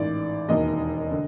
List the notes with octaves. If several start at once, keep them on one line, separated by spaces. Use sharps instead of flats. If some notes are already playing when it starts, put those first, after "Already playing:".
Already playing: A1 G#2 D#3 D5
E1 D#2 D#3 D#5
D3